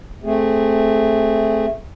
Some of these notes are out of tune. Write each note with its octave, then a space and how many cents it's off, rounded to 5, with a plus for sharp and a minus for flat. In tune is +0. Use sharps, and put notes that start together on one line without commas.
A3 +0 C4 +0 G#4 -10